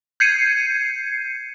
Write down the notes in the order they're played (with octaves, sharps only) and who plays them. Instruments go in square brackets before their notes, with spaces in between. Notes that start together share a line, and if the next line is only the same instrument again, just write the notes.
[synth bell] G6 G#6 C7 C#7 D#7